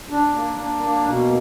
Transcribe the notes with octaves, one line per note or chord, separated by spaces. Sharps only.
D4
A#3
D4
A#3
B2